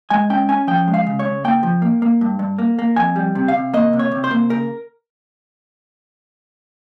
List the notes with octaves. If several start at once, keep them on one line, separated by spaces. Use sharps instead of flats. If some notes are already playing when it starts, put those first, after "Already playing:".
G#3 G#5
C#4 G5
C#4 G#5
F3 G5
G#3
F5
C#3
C#5
C#3
A#3 G5
F3
A#3
A#3
G2
G2
A#3
A#3
F2 G#5
G3
C3
F5
C3
A#3 D#5
C3
C#5
C3
C5
A#3
C#3 A#4